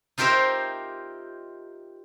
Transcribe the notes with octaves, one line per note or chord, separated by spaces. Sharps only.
D#4 F4 G4 A#4 C5 E5